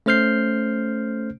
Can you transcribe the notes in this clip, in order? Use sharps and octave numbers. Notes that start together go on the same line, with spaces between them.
A3 C#4 C5 F6 G6 C7